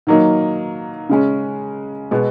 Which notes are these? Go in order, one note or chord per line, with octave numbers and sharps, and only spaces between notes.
D#3 F#3 A#3 D#4
C#3 G#3 C#4
B2 G#3 B3